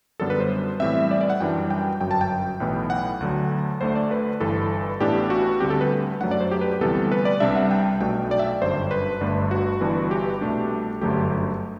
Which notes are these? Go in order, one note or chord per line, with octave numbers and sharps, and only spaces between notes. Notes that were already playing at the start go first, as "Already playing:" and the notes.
F#2 D3 G3 B3 A4
B4
C5
A2 E3 G3 C4 E5
D5
D5
F#5
F#2 E3 G3 D4 G5
G5
G1 F#2 F#3 G5
A5
G5
B1 A2 E3 B3
F#5
D2 D3 F#3
D2 D3 A3 D4 C5
D5
B4
G1 G2 E3 A4
A1 A2 E3 B3 D4 G4
F#4
D2 D3 G3 C4 G4
A4
B4
F#2 F#3 A3 D4 F#5
D5
C5
G4
B4
G4
D2 C3 E3 G3 B3 A4
B4
D5
C2 C3 G3 D4 E5
F#5
G5
B1 B2 A3 D4 G5
D5
E5
D5
G1 F#2 D3 G3 C5
B4
G1 G2 D3 A3 D4
F#4
G1 G2 E3 B3 D4
G4
C2 B2 A3 D4
G1 F#2 D3 F#3 A3 G4